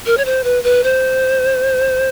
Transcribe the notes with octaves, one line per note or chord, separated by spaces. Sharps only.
A#4
C#5
C5
B4
B4
C5